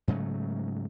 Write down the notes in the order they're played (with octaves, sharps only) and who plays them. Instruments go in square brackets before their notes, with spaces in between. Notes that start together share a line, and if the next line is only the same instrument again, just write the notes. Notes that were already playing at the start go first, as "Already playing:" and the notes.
[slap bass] G#2 C#3 F#3 A3